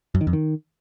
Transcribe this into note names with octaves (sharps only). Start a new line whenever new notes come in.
F#2
D#3
F2
D#3